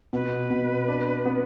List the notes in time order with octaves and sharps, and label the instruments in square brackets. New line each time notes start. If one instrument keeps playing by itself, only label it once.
[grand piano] B2 [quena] B4
[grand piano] B2
D4
B3